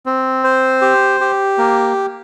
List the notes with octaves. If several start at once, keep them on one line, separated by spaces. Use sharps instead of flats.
C4
C5
G4
G4
A#3